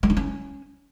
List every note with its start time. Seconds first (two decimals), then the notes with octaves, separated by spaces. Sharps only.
0.03 G#3
0.10 D4
0.17 C#4